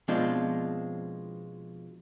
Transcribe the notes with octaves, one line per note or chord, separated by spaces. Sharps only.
B2 F3 G#3 C4 D4 F4